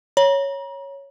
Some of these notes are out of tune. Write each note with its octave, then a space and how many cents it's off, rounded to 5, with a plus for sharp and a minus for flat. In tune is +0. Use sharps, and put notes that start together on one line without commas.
C#5 +0 A#5 +35